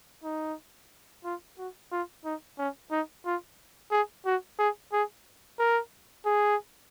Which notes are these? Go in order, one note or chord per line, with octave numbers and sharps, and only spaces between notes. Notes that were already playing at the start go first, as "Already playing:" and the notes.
D#4
F4
F#4
F4
D#4
C#4
D#4
F4
G#4
F#4
G#4
G#4
A#4
G#4